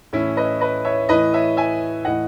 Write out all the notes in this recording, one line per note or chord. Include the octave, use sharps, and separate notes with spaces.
A2 E3 C#4 E4
B4 D#5
B4 D#5
C#5 E5
A2 E3 B4 D#5
C#5 E5
E5 G#5
A2 E3 D#5 F#5